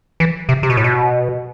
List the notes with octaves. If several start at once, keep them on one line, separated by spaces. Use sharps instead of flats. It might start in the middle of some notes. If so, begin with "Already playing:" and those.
E3
C3
C3
B2
A2
B2